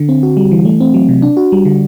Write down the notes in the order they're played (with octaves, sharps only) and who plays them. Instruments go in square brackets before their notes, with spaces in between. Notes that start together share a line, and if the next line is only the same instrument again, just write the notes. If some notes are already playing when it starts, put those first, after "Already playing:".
Already playing: [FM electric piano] D3
C4
F#4
G3
E3
A3
C4
F#3
C3
D4
F#4
G3
D3